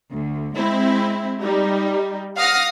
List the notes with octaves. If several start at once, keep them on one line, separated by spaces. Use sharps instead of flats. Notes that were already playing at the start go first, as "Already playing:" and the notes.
D2
G#3 C4 E4
G3 D#4
F5 F#5 D#6 F6 A#6